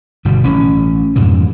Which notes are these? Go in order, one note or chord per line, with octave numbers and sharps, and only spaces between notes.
G1 B2 G3
A1 C#4
F2 G#2 B2 E3